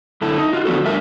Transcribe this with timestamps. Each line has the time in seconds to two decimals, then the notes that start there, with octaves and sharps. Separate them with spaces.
0.21 F#2 D3 E4 A4
0.38 D#4
0.53 F4 F#4
0.65 D3 F3 B3 D4 F#4 A4
0.85 G3 A3 D4 A#4 E5